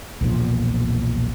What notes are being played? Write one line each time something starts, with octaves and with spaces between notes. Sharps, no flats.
B1 E2 A#2 F3